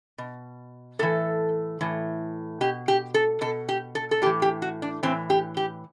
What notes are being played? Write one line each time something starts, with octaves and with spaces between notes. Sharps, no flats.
B2
A2 E3 A4
A2 E3
B2 G4
G4
A4
B2 A4
G4
A4
A4
A2 E3 G4
G4
F#4
D4
A2 E3 C4
G4
G4